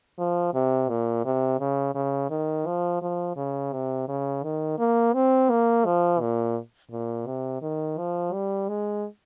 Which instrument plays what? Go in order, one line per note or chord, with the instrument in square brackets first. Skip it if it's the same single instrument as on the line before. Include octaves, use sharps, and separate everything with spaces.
[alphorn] F3
C3
A#2
C3
C#3
C#3
D#3
F3
F3
C#3
C3
C#3
D#3
A#3
C4
A#3
F3
A#2
A#2
C3
D#3
F3
G3
G#3